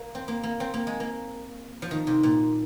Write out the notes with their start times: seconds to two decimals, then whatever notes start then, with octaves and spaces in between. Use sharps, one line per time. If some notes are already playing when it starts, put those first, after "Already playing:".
Already playing: A#3
0.15 C4
0.28 A#3
0.43 A#3
0.60 C4
0.74 A#3
0.87 G#3
1.00 A#3
1.82 F3
1.91 D#3
2.07 C3
2.23 A#2